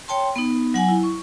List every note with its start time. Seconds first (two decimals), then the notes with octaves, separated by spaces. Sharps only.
0.08 C#5 G5 A5 C6
0.36 B3 D#4
0.74 F#3 F#5 G#5
0.88 E4
1.03 C#6